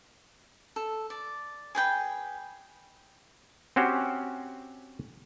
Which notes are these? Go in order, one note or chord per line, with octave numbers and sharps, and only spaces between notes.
A4
D5
G#4 B4 G5 B5
C4 C#4 F#4 G4 C5